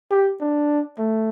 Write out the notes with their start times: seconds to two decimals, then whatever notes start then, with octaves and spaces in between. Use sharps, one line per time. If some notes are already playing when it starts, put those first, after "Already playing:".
0.11 G4
0.41 D4
0.98 A3